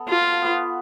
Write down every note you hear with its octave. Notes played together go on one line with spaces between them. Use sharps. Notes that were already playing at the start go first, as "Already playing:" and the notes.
Already playing: B3 A4
F3 F4
B3 F#4 B4